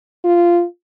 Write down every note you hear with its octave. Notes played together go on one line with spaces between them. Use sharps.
F4